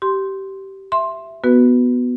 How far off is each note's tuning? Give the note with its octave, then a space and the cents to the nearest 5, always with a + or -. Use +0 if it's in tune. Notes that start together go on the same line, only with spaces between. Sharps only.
G4 -20 C6 +0
E5 +10 C6 +10
B3 +0 F#4 +0 B4 +0